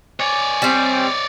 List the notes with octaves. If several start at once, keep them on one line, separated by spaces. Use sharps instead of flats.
C#5 D5 G#5
G3 C4